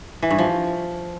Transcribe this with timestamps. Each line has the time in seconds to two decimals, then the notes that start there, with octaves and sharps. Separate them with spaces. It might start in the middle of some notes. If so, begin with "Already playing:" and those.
0.23 E3
0.30 G2
0.38 F3